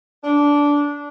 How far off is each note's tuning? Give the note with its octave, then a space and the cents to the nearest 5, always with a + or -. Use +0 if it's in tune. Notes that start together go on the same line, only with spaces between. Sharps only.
D4 -15